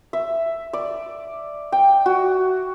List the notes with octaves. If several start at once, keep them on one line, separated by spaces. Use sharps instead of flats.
E5
D5
G5
F#4